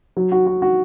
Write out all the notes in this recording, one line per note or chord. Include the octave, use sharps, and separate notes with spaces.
F#3
F#4
F#4
F#4